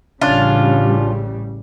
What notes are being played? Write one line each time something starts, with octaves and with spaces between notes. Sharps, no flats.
A1 C#3 G3 C#4 D4 F4